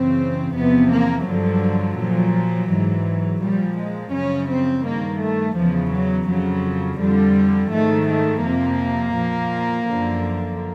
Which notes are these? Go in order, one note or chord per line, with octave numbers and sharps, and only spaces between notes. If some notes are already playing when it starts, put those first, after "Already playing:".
Already playing: F#2 C#3 E3 C4
E2 C3 F3 B3
A#3
G2 D3 F3 F#3
A#2 F3
G#2 E3
A#2 F3 G3
G#3
F#2 C#3 F3 C#4
C4
G2 D#3 A#3
A3
E2 C#3 E3 F3
F#3
F2 C#3 F3 F#3
F2 D3 F3 G3
G#2 D#3 A3
A3
F2 C3 F3 A#3
A#2 F3
F#2 D3 F3